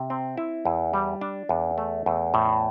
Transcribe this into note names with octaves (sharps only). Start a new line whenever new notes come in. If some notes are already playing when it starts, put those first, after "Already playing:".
Already playing: C3
C4
E4
E2
G3
D4
E2
A3
E2
A2